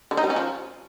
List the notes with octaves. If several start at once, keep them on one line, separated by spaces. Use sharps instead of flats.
D3
D#4
G3
C#4
F3